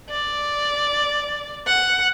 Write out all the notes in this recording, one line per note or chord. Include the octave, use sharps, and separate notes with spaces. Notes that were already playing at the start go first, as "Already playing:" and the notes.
D5
F#5